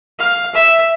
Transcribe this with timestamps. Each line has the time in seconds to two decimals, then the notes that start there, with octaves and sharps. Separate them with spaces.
0.19 F5
0.55 E5